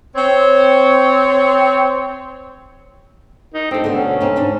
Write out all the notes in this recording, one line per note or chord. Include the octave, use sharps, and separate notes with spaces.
C4 C#5
D#4
C4 D4 A4
D2 B2 D3 B3
C#4
C4 D#4
G#2 D4 D#4